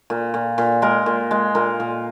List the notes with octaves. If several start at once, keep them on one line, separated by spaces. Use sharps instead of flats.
A#2
A#2
A#2
G#3 A#4
A#2
G#3
A#2 A#4
A#2